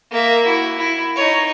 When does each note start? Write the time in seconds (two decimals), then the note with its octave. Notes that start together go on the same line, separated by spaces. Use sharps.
0.11 A#3 E5
0.46 E4 F#4
0.78 E4
1.16 D#4 C#5